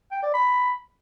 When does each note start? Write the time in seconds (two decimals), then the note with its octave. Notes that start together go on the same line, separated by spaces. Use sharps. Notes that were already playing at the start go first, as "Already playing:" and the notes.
0.12 G5
0.23 D5
0.34 B5